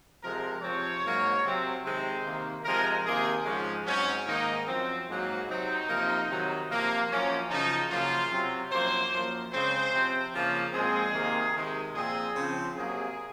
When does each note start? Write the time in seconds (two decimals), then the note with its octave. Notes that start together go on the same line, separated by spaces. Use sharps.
0.22 C3 F3 G#3 A#4
0.62 C3 F3 C4 C#5
1.03 G#2 F#3 A#3
1.44 C3 F#3 C4
1.84 C3 D#3 G#3 C4 C5
2.25 C3 D#3 A#3
2.64 C3 F3 G#3 A#4
3.05 C3 D#3 A#3 G#4
3.45 G#2 F3 G#3 C#4
3.85 G#2 F#3 C4 C#4
4.26 G#2 D#3 A#3 D#4
4.66 F#2 F3 C4
5.07 G#2 F#3 A#3
5.48 C3 F#3 C4 D#4
5.88 C3 F3 A#3
6.28 C3 D#3 F#3
6.69 C3 F3 A#3
7.09 F#2 F3 A#3 C#4
7.50 F#2 C#3 F3 D#4
7.90 F#2 C#3 F3 A#3 F4
8.30 C3 F#3 C4
8.71 F#2 F3 A#3 C5
9.11 F#2 F3 A#3
9.52 C#3 G#3 C4 C5
9.92 C3 F3 C4
10.32 C#3 F3 A#3
10.73 A#2 F3 G#3 C4 G#4
11.13 C3 D#3 A#3
11.54 C3 D#3 G#3
11.94 A#2 F3 C4 G#4
12.35 C#3 F3 C4
12.75 C3 F#3 A#3 G#4